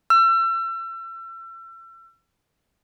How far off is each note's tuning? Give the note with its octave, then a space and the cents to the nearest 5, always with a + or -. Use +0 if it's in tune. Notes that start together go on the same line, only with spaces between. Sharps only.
E6 +35